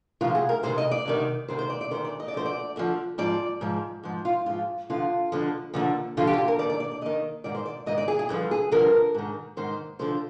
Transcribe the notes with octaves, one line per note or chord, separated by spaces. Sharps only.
D2 C3 F3 F4
G#4
A#4
D2 C3 D#3 C5
D#5
D5
D2 C3 D#3
D2 C3 D#3 C5
C5
D5
D5
D2 C3 D#3 C5
D5
D#5
D5
D2 D3 F3 C5
D5
D2 D3 F3
G#2 F3 D5
G#2 F3
G#2 F3
F4
G#2 F3 F4
F2 D3 F3 F4
F2 D3 F3
D#2 D3 F3
D#2 D3 F3 F4
G4
F4
G4
A#4
D#2 D#3 D5
D5
D5
D5
D#2 D#3 D#5
G#2 D#3 D5
C5
D5
G#2 D#3 D#5
D5
G#4
G#4
G2 D3 F3
G#4
G2 D3 F3 A#4
G#2 D#3
G#2 D#3 C5
F2 D3 F3 C5